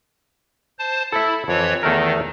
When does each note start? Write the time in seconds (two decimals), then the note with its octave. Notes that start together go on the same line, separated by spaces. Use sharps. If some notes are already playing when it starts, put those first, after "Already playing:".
0.78 C5 A5
1.12 E4 A4 E5
1.48 F2 E3 C#5
1.83 E2 D#3 A3 A#4